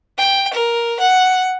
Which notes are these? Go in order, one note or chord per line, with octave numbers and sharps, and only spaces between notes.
G5
A#4
F#5